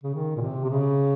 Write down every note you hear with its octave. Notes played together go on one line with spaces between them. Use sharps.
C#3
D#3
A#2
C3
C3
C#3